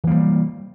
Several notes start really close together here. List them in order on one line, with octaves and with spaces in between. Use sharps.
E3 A#3 G3